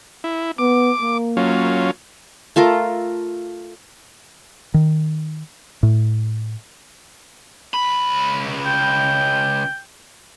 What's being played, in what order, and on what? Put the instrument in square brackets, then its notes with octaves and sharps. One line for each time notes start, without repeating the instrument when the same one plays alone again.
[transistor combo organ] E4
[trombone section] B3 [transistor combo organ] D6
[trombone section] A#3
[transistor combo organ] F#3 C#4 F4
[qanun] A3 F4 A4 A#4
[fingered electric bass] D#3
A2
[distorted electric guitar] C#2 B5
[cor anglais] G5